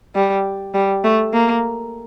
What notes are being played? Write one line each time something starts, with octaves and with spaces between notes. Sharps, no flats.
G3
G3
A3
A#3